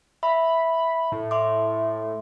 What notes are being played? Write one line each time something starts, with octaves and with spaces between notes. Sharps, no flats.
E5 B5
A2
E5 C6 D6